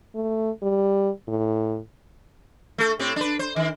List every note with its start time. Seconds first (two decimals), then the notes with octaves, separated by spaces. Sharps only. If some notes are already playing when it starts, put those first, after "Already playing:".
0.15 A3
0.63 G3
1.28 A2
2.78 A3 A4
2.99 A2 C4 G4
3.16 D4 B4
3.39 C5
3.56 D#3